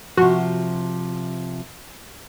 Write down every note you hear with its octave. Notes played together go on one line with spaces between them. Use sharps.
C3 F3 F#4